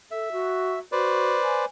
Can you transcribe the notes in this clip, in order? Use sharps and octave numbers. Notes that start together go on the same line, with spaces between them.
A4 E5
F#4
F#4 B4 C5 D5
G#5